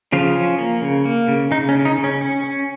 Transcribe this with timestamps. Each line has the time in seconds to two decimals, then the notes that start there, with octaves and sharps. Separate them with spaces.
0.12 C#3 F3 F4
0.36 C#4
0.58 A#3
0.82 C#3
1.05 A#3
1.28 C#3
1.51 C#3 D#4
1.69 C#4
1.74 C#3
1.85 D#4
1.98 C#3
2.04 C#4
2.21 C#4
2.44 C#4